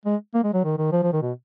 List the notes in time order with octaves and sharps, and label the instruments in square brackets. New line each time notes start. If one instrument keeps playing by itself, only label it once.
[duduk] G#3
A#3
G#3
F#3
D#3
D#3
F3
F3
D#3
B2